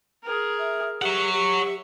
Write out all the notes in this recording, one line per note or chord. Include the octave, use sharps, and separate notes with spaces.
G#4 A#4
E5
G4 C#5 E5 F#5 C#6
G4